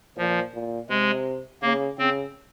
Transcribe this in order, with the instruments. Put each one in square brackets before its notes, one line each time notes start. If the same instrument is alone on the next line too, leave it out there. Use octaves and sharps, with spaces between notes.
[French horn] A#2 [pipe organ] F3
[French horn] A#2
[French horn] C3 [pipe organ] G#3
[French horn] C#3 [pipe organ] A#3
[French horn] C#3 [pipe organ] C4